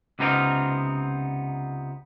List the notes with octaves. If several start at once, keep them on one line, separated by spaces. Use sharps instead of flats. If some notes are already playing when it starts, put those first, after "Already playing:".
C#2 C3 B3 C4 D#4 A#4